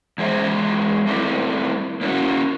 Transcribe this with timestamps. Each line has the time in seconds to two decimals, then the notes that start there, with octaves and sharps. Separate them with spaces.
0.18 E2 G#3 G#4 C5 E5
1.07 G3 A3 C4 E4
2.01 A#3 C#4 E4 F#4 C#5